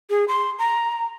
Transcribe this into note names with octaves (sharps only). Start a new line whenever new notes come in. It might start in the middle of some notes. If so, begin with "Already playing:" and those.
G#4
C6
A#5